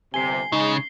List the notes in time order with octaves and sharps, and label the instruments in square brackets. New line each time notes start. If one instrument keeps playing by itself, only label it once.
[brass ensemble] G1 C3 [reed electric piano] G#5 [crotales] C7 G7
[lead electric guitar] C#3 [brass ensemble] G#3 [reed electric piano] D#4